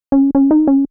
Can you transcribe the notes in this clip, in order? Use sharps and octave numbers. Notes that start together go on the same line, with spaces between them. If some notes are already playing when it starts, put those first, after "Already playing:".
C#4
C#4
D#4
C#4